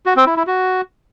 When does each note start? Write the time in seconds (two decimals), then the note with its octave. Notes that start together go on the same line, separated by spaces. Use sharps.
0.06 F#4
0.16 C4
0.26 E4
0.37 E4
0.47 F#4